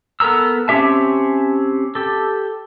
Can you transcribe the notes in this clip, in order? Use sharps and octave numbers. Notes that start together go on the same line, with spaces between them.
B3 A4 A#4 A#5 E6
C4 C#4 G4 E5 A5
G4 A4